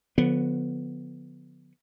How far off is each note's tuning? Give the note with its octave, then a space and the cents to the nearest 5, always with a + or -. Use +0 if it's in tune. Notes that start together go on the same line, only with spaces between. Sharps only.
D3 +0 F3 +35 B3 +0